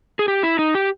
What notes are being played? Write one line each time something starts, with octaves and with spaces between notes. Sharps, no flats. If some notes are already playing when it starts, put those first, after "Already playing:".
G#4
G4
E4
D#4
G4